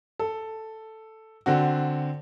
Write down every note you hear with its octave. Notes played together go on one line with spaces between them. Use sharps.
A4
D3 C4 F#4